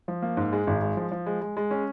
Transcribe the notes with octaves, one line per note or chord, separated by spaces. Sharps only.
F3
A#3
G#2
G#3
G#1
G#3
F3
F3
G#3
G#3
G#3
C#4